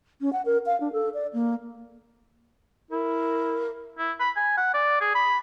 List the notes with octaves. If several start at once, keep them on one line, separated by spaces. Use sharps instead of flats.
C#4
F#5
A#4
F5
D4
A4
D5
A#3
E4 A#4
E4
B5
G#5
F#5
D5
G#4
B5